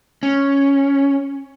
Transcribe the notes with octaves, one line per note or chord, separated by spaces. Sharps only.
C#4